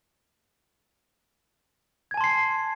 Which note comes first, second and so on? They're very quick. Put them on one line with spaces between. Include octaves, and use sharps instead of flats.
G#6 G#5 A5 C6 C7